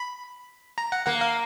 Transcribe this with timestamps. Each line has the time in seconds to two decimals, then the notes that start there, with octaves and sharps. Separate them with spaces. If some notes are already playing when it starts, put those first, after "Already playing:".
Already playing: B5
0.78 A#5
0.92 F#5
1.06 A#3 F#5
1.21 F5